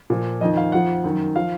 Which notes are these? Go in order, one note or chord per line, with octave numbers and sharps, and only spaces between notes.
A#2 F3
F2 D#3 D#5
F5
F2 F3 F#5
F#2 D#3
F3 F5